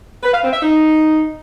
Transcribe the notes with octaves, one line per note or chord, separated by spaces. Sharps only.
B4
F5
C4
E5
D#4